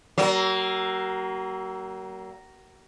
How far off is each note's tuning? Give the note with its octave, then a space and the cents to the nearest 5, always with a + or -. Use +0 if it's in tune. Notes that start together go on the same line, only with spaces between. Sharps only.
F#3 +40 A#3 +0